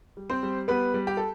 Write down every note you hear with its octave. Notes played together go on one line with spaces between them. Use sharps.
G3
C4 C5
G3
G3 B3 B4
G3
G4
A4